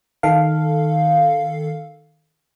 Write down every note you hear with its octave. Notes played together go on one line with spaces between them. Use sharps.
D#3 A4 F5